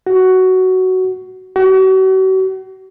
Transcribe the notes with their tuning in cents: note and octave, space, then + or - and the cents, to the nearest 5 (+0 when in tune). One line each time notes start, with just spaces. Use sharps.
F#4 +10
F#4 +40